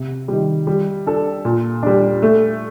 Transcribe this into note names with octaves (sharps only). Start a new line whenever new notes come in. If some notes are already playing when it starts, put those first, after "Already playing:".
Already playing: C3
D#3 G3
G3
D4 A4
A#2
G3 D4
A3